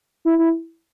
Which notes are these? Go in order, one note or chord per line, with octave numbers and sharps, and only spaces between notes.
E4
E4